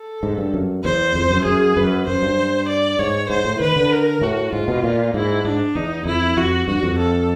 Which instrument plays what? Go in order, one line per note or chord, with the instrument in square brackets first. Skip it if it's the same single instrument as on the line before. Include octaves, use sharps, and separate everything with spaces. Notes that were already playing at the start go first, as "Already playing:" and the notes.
Already playing: [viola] A4
[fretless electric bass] G#2
G2
F#2
[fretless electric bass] E2 [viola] C5
[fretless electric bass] F2
F#2
[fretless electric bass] F#2 [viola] G#4
[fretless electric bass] F#2 [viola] B4
[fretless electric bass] F#2 [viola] C5
[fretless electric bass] G2
[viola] D5
[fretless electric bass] G#2 [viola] C#5
[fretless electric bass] G#2 [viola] C5
[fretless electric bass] A2
[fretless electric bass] D#3 [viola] B4
[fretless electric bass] D3
[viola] A#4
[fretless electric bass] A2 [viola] F#4
[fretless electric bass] G#2 [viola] F4
[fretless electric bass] B2
A#2
[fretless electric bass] G#2 [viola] E4
[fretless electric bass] G#2 [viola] D4
[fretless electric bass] E2 [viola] D#4
[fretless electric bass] F2 [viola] E4
[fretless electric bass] F2 [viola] F#4
[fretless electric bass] G2 [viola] F#4
[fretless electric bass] F2
[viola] A4